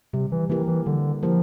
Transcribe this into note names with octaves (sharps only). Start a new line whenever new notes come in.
C3 G3
E3
E3 A#3 E4 G4 A#4
E3
D3 G3
F3 A#3 E4 G4 A#4